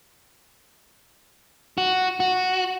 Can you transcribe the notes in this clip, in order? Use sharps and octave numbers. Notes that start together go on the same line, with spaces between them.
F#4
F#4